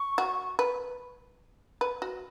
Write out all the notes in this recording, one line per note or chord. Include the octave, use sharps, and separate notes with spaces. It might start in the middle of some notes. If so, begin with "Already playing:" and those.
Already playing: C#6
F#4
B4
B4
F#4